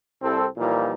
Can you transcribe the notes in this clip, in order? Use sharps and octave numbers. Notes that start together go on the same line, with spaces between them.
C2 C4 A4
A#2 E3 F3 G3 A#3 D#4